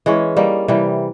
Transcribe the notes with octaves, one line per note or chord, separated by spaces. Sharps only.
E3 G#3 C#4
G3 A#3 D#4
C3 E3 G3